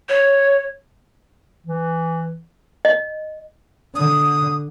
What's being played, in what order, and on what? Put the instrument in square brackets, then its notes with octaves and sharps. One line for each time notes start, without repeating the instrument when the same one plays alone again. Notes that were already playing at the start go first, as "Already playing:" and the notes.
[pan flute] C#5
[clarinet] E3
[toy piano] D#5
[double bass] D3 [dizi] D#6